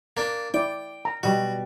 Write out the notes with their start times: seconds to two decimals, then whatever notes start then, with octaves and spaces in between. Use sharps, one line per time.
0.17 A#3 D4
0.54 E4 D5 G5
1.05 A#5
1.23 B2 G3 F#4